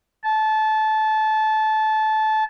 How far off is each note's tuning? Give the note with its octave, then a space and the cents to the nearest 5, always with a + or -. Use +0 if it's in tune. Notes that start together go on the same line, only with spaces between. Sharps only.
A5 -20